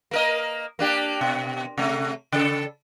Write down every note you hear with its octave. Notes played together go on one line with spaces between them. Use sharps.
A#3 A#4 D#5
A#3 D4 G4
B2
C3 A3
C#3 A4